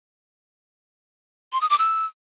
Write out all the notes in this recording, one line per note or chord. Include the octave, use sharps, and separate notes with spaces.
C6
D#6
D6
E6